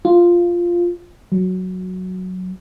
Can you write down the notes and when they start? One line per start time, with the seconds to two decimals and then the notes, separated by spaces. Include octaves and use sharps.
0.05 F4
1.32 F#3